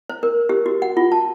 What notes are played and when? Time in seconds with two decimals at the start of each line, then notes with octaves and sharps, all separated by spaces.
0.09 C5
0.23 A#4
0.49 G4
0.66 F#4
0.82 F#5
0.97 F4
1.12 A5